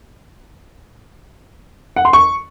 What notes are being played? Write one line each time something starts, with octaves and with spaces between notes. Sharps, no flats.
F#5
C6
C#6